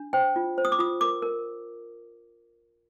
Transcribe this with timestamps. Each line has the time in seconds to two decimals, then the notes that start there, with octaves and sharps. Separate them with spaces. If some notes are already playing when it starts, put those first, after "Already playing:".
Already playing: D4
0.13 C5 G5
0.36 F4
0.58 C5
0.65 D#6
0.72 D6
0.79 F4 D#6
1.01 A#4 D6
1.22 A#4